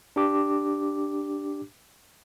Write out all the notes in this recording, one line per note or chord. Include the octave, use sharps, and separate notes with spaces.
D4 G4 D6